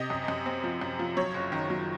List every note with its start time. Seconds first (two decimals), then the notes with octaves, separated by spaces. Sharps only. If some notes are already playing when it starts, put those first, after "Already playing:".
Already playing: C3 D#5
0.10 F#2
0.28 F#2
0.46 C4
0.64 F3
0.81 F#2
0.99 F3
1.17 F#3 C#5
1.34 F#1
1.52 D#3
1.70 F#3